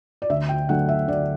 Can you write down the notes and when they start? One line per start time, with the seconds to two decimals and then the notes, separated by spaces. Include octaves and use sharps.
0.22 D5
0.29 D2 E5
0.49 G5
0.69 D3 F#3 A3 D4 F#5
0.88 E5
1.08 D2 D5